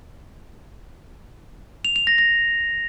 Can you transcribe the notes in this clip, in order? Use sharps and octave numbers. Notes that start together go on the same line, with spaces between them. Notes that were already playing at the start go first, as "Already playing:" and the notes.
F7
F7
A#6
A#6